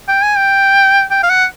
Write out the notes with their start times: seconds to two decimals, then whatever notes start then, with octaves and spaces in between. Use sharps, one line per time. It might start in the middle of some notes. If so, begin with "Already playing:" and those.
0.08 G5
0.22 G#5
0.37 G5
1.11 G5
1.23 F5
1.30 F#5